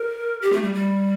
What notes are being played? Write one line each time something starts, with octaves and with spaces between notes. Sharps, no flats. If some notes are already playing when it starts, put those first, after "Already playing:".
Already playing: A#4
G4
A3
G3
G3